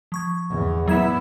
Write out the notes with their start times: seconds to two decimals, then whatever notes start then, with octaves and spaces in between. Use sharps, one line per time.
0.12 F3 C#6 G#6
0.50 E2
0.88 F#3 B3 E4 G#6 E7